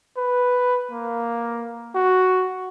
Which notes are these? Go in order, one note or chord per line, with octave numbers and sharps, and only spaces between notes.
B4
A#3
F#4